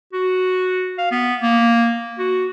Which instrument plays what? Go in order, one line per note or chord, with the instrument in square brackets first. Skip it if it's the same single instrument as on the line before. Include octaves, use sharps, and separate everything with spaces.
[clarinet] F#4
F5
B3
A#3
F#4